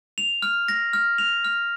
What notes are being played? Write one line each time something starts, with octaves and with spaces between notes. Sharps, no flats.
F7
F6
A#6
F6
F7
F6